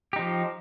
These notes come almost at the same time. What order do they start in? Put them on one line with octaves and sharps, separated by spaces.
G4 D#4 F3